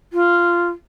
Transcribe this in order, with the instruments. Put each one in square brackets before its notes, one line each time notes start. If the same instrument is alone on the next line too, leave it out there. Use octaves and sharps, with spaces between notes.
[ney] F4